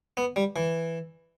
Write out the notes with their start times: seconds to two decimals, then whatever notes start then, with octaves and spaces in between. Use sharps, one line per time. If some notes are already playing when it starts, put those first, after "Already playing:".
0.17 B3
0.36 G3
0.56 E3